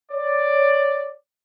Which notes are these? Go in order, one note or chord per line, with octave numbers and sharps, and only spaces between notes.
C#5 D5